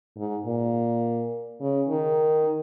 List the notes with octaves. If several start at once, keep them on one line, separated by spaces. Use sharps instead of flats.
G#2
A#2
C#3
D#3